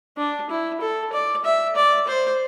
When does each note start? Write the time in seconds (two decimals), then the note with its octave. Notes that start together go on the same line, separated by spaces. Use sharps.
0.17 D4
0.49 E4
0.81 A4
1.13 D5
1.45 E5
1.76 D5
2.07 C5